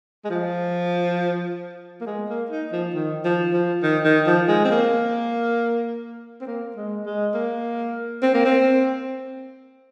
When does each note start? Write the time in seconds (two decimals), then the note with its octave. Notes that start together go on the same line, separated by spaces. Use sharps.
0.25 G#3
0.30 F3
2.01 A#3
2.06 G#3
2.29 A#3
2.50 D#4
2.72 F3
2.95 D#3
3.24 F3
3.53 F3
3.83 D#3
4.05 D#3
4.26 F3
4.48 G#3
4.65 C4
4.71 A#3
6.41 C4
6.47 A#3
6.76 G#3
7.06 G#3
7.34 A#3
8.22 C4
8.34 A#3
8.45 C4